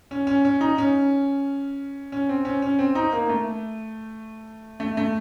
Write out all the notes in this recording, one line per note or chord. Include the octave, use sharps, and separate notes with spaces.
C#4
C#4
C#4
D#4
C#4
C#4
C4
C#4
C#4
C4
D#4
A#3
A3
A3
A3